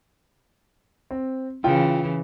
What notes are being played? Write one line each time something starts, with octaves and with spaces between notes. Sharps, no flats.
C4
C#3 E3 F4 G5